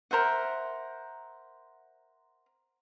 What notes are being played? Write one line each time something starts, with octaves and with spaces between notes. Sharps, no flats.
A#4 C5 E5 F#5